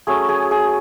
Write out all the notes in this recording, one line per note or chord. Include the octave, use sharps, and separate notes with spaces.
F#3 A3 C#4 G#4
G#4
G#4